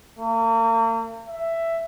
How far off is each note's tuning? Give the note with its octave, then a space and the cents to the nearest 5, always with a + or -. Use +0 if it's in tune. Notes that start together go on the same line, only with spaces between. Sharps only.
A#3 -40
E5 +10